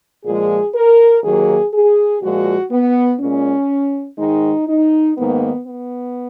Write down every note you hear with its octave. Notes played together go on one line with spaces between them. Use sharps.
A#2 F3 G#3 G#4
A#4
D#2 D#3 F#3 A#3 G#4
G#4
A#2 F3 G#3 F#4
B3
A#2 G#3 C#4
G#2 D#3 G#3 D#4
D#4
G#2 D#3 A#3 B3
B3